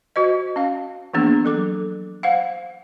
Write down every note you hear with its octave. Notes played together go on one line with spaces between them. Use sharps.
F#4 C5 D#5
C#4 F5
E3 F3 A#3 B3 D4 G#4
F#3 A4 D6
C5 F5 F#5